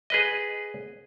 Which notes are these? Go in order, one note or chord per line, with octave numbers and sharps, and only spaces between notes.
G#4 B4 D#5